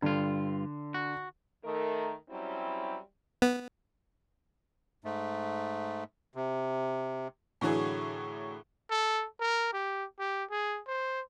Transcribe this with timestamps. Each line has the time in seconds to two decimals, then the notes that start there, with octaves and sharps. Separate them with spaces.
0.02 G2 D3 F4
0.94 F#4
1.65 D#3 A3 A#4
2.30 F#3 G3 C4 C#4 E4 G4
3.42 B3
5.04 G#2 A3
6.35 C3
7.61 A2 D3 E3 F#3 G#4
8.90 A4
9.40 A#4
9.73 G4
10.19 G4
10.51 G#4
10.87 C5